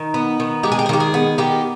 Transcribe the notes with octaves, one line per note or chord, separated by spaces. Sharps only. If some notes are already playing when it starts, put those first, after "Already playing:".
Already playing: D#3 D#4
B3
D#3
G#3 G4
G#4
G4
G#4
D#3 G4
G#4
B3
D#3 G4